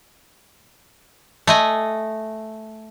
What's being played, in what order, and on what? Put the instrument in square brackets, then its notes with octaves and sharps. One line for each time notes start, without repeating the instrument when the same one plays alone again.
[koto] A3 D#5 G#5